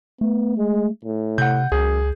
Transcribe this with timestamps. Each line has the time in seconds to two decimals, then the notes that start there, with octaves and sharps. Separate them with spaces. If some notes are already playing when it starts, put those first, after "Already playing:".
0.21 A3 B3
0.58 G#3
1.05 A2
1.38 C3 F#5 G6
1.72 C#2 F#2 G#4